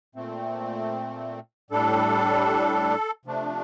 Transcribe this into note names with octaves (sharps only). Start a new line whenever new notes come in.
A#2 A3 C4
A2 G3 D4 A4
C3 F3 A3 D4